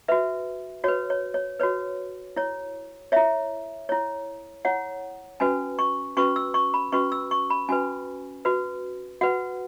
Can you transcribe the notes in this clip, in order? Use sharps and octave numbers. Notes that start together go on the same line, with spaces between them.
F#4 B4 E5
F#4 B4 C#5
C#5
C#5
F#4 B4 C#5
E4 C#5
E4 C#5 E5
E4 C#5
E4 C#5 F#5
C#4 F#4 B4 G#5
C#6
C#4 F#4 B4 C#6
E6
C#6
B5
C#4 F#4 B4 C#6
E6
C#6
B5
C#4 F#4 B4 G#5
F#4 B4
F#4 B4 F#5